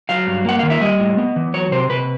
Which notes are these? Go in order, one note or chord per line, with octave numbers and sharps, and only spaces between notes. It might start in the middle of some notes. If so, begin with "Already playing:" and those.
F#3 F5
G2
A#3 F#5
D#3 F5
E5
G3 D#5
A2
B3
E3
F#3 C#5
C3 C5
C3 B4